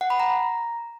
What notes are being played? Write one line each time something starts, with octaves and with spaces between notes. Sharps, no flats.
F#5
B5
A#5